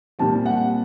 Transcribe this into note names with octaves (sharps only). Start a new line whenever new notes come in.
A#2 G3 C4 A5
F#5